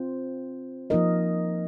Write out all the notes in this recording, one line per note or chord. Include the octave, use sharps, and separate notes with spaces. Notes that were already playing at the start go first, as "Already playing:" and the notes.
Already playing: C4 F4 C5
F3 A#3 D#4 A#4 D#5